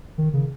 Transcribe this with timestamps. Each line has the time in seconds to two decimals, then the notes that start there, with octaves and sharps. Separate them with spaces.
0.18 D#3
0.34 C#3